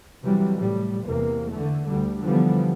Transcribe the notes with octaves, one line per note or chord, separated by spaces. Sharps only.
C3 E3 F#3 G3
A2 G3
E2 C3 A#3
D3 A3
D2 G3
D3 E3 F3 G3 B3